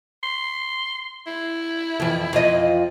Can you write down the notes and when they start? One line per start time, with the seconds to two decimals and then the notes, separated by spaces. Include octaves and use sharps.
0.23 C6
1.27 E4
2.00 F2 E3
2.33 F2 F4 D#5